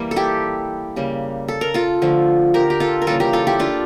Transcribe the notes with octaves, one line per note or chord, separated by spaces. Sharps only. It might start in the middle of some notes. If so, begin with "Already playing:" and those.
Already playing: E3 G3 A#3
A4
E4 G4
C#3 G3 A#3
A4
A#4
F4 A4
D3 F3 A3
G4 A#4
G4
F4 A4
A#4
C#3 E3 G3 A#3 F4 A4
G4 A#4
F4 A4
E4 G4
D4 F4